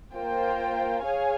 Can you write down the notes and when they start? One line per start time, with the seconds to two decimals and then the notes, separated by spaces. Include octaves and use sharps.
0.14 A#3 F4 C5 G5
1.03 G#4 C#5 F5 G#5